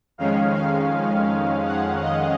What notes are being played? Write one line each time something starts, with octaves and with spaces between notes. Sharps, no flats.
F2 D#3 G#3 C#4 F5
F5
F#5
D#5